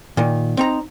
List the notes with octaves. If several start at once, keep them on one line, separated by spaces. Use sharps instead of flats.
A#2 D#3
C4 D#4 A#5